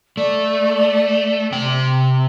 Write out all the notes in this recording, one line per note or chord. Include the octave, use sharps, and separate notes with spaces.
A3 D5
C3 C4 G5